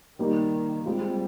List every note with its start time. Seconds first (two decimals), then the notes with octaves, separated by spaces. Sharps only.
0.18 D#3 G3 A#3 D#4 G4
0.85 G3 G#3 C4 F4